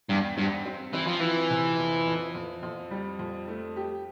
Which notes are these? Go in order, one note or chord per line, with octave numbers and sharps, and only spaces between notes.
E2 G2
G2 C4
C4
E3 C4
F3
E3 F3
C3
F2
F2
F2
F2
G3
F2
A3
G4